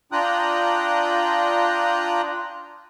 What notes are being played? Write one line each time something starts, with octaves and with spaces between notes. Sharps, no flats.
D4 F4 G5 A#5 D#6 F#6